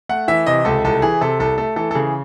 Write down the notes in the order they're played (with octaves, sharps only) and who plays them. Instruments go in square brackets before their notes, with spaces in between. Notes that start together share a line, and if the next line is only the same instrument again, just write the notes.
[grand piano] A3 F#5
E3 E5
C3 D#5
C#2 A4
C2 A4
E3 G#4
C3 A4
C2 A4
A3 A4
E3 A4
A4
C#3 G#4